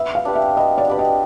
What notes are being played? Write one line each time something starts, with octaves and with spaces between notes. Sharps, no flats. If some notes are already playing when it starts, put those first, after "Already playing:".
Already playing: B3 E5
F5
D4 G4 B4
E5
B3 D#5
D5
D4 G4 B4
D#5